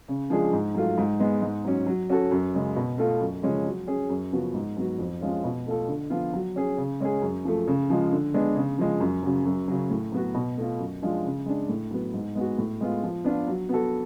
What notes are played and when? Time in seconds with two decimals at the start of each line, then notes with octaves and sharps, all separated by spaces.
0.08 C#3
0.30 F3 G#3 D4 G#4
0.53 G#2
0.75 F#3 A3 F4
0.98 G#2
1.20 G#3 B3
1.42 G#2
1.65 F#3 C#4
1.86 F#3
2.10 C#4 F#4 A4
2.31 F#2
2.54 C#3 G#3
2.76 B2
2.98 A3 F4 A4
3.21 F#2
3.43 C#3 F3 G#3 C#4
3.66 F#3
3.87 C#4 G#4
4.10 F#2
4.32 C#3 F3 B3 F#4
4.54 G#2
4.77 F#3 B3 F#4
4.99 F2
5.21 F3 G#3 C#4 F4
5.44 B2
5.66 A3 F4 A4
5.88 D3
6.10 F3 B3 F4
6.33 F#3
6.56 C#4 G#4
6.78 C#3
7.00 G#3 C#4 G#4
7.22 F#2
7.45 F3 A3
7.67 C#3
7.90 F3 G#3
8.12 D3
8.34 G#3 B3 D4
8.56 C#3
8.78 F3 G#3
9.00 F#2
9.23 C#3 F#3
9.45 F#2
9.68 C#3 F#3
9.90 A2
10.12 F#3 B3 F#4
10.35 B2
10.57 A3 F4
10.79 F#2
11.02 F3 G#3 D4 F4
11.25 C#3
11.46 G#3 D4
11.69 A2
11.91 F#3 B3
12.14 G#2
12.35 G#3 B3 F#4
12.58 A2
12.81 G#3 B3 F4
13.03 F3
13.24 B3 D4 F4
13.47 F#3
13.69 B3 F#4 A4